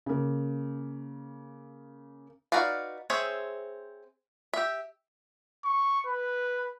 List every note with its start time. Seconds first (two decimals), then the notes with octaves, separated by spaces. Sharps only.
0.06 C#3 A#3
2.52 D#4 F#4 B4 D5 F5
3.10 C4 G#4 C5 C#5 E5
4.53 G4 E5
5.65 C#6
6.07 B4